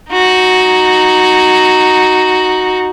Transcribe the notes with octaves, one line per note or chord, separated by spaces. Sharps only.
D#4 F#4